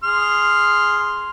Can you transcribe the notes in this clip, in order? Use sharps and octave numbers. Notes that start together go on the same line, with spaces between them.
G#4 C6 F6